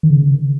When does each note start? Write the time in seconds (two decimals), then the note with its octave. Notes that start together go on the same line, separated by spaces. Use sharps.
0.03 D#3
0.11 C#3